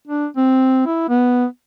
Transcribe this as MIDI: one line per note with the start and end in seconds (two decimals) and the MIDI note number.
0.07 0.26 62
0.37 0.83 60
0.86 1.04 64
1.09 1.45 59